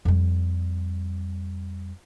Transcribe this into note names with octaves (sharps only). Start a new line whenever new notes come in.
F2 G3